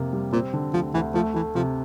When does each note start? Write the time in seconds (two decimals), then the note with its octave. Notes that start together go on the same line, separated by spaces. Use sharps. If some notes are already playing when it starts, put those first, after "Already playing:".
Already playing: F2 C3 A#3
0.13 G3
0.33 A#2 C4
0.53 D3
0.73 D2 F3
0.94 D2 E3
1.14 F3 A3
1.34 E3 A3
1.55 C3 F3